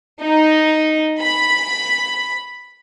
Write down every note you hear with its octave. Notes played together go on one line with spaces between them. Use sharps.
D#4
B5